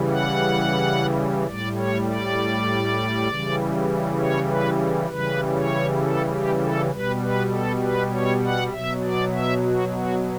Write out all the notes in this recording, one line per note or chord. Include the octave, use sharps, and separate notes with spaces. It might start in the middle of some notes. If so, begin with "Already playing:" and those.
Already playing: C#3 E3 G3
F#5
A2 G3 D5
C#5
D5
C#3 E3 G3
C#5
B4
C#3 E3 G3 B4
C#5
A4
G4
A4
B2 G3 B4
B4
A4
B4
C#5
F#5
B2 F#3 E5
D5
E5
F#4
F#4